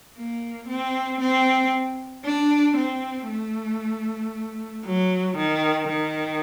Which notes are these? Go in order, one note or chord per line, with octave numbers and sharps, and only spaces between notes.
A#3
C4
C4
D4
C4
A3
F#3
D#3
D#3